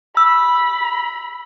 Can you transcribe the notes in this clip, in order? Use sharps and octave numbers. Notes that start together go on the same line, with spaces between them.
B5 E6